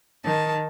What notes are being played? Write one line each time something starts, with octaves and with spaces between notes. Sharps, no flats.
D#3 A5